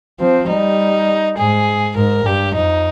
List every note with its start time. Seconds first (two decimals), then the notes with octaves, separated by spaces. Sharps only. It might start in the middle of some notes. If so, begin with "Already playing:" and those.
0.20 F3 C4
0.49 G3 D#4
1.37 G#2 G#4
1.96 G#2 A#4
2.26 G2 G4
2.55 F2 D#4